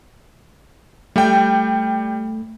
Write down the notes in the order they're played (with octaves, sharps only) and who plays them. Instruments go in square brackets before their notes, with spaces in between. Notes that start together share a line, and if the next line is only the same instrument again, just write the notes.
[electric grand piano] G3 G5 [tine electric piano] A3